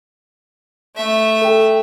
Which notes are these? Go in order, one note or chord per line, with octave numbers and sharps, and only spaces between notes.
A3 E5
A4 G5